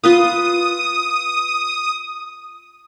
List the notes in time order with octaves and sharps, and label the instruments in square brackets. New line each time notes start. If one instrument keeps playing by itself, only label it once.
[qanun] F4 B4 F5 [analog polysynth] D#6